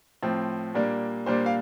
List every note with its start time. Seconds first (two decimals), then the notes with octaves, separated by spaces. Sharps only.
0.23 A2 F3 C4
0.74 A#2 G3 A#3 D4
1.26 A#2 G3 A#3 D4 C5
1.46 F5